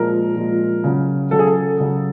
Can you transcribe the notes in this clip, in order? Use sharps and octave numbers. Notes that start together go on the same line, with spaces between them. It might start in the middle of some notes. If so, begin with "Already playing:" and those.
Already playing: A#2 F3 G#3 A#4
A#2 F3 G#3
C#3 F#3
C#3 F#3 A4
G#4
A4
C#3 F#3